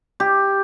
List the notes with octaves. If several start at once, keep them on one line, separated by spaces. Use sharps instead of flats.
G4